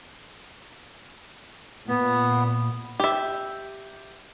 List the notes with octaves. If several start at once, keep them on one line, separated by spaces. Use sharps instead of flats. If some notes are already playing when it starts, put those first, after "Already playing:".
A#2 B3
G4 E5